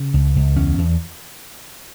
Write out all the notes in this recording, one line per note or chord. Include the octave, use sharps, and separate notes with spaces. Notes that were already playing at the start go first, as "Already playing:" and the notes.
Already playing: C#3
C#2
C#2
E2 C#4
E2